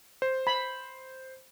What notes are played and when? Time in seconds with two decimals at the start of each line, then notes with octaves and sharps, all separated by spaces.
0.22 C5
0.47 B5